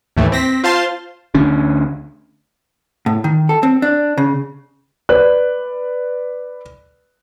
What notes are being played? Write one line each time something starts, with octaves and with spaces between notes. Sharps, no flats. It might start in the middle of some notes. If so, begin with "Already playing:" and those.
D#2 A2 E3 A3
C4 A#6 B6
F4 C5 F5 A5 C6
D2 D3 C#4 D4
A2
D#3
A4
C4
D4
C#3
B4 D5 F#6